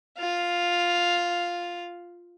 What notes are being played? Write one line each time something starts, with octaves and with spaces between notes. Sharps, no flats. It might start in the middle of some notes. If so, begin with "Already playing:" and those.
F4 F5